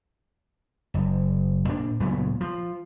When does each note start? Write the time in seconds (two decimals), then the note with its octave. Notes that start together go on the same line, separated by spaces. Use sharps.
0.94 F#1
1.68 A#2 D4
2.00 C#2 A#2 F#3 B3
2.41 F3